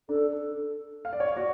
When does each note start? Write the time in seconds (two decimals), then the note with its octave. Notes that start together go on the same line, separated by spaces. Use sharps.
0.09 D4 A4
1.05 F5
1.13 D5
1.20 C#5
1.27 D5
1.36 F#4